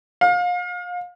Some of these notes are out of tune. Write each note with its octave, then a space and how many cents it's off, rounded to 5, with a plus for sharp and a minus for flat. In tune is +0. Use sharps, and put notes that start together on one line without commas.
F5 +30